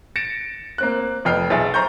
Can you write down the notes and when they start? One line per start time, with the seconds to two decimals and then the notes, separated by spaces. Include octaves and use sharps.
0.16 A6 A#6 C#7 D7 E7
0.78 A#3 C4 F#6
1.25 F1 B3 D#5 G5 F6 C7
1.50 B1 G#4 E5 A6
1.74 C5 A#5 C#6 G6